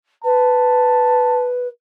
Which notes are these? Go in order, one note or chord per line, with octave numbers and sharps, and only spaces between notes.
B4 A5